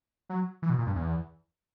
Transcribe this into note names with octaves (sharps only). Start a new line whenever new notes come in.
F#3
E3
B2
A#2
G2
E2